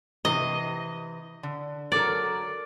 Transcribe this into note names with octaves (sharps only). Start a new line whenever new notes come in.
C3 E3 D#5
D3
F#3 A4 A#4 D5